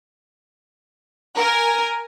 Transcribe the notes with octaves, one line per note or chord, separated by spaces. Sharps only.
A#4 G#5